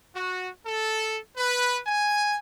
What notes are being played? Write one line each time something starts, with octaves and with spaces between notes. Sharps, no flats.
F#4
A4
B4
G#5